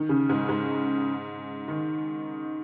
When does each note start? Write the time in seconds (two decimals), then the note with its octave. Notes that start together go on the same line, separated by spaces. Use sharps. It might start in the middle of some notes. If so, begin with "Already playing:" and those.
Already playing: D#3
0.09 C#3
0.29 G#2
0.49 G#2
1.68 D#3